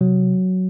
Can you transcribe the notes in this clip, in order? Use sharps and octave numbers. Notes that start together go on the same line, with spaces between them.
C3 F#3